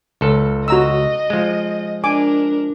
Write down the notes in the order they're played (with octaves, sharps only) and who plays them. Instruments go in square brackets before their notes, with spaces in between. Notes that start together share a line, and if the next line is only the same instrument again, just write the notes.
[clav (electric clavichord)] C#2 A4
[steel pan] F#4 A#5 E6 [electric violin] D#5
[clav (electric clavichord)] F3 G#3
[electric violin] D4 A#4 [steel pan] G#5 D6